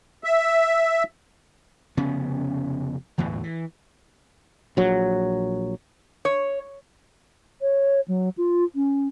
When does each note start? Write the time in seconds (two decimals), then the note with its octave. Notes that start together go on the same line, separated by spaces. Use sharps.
0.24 E5
1.97 F1 C#3 B3 C#4
3.18 G1 E2 A2 E3
3.44 E3
4.77 A#1 F#3
6.25 C#5
7.61 C#5
8.08 F#3
8.37 F4
8.75 C#4